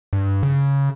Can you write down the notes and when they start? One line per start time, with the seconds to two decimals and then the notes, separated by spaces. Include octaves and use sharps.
0.13 G2
0.43 C#3